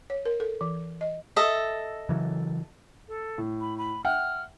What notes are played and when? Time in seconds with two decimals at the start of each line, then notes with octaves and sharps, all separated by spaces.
0.10 C#5
0.25 A#4
0.40 A4
0.61 E3
1.01 D#5
1.36 A4 D#5 E5
2.09 C#3 E3 F#3
3.08 A4
3.38 A2
3.61 B5
3.78 B5
4.05 E5 F#5 G5 F6